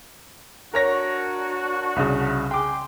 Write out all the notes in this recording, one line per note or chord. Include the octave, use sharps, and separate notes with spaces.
D4 F#4 A#4 C#5 A#6
C2 C#3
G#4 G5 C6 D6